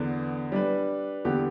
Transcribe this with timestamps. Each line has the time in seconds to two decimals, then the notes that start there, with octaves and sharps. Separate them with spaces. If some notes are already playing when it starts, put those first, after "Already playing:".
Already playing: E2 D3 B3
0.52 G3 D4 B4
1.25 E2 D3 B3 G4